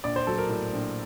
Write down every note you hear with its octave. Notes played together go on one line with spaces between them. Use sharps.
A#1 D5
C5
F#3 A4
A#4
A2
A#1